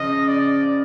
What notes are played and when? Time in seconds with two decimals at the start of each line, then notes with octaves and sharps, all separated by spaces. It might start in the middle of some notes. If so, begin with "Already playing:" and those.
Already playing: C#3 F3 D#5
0.28 D5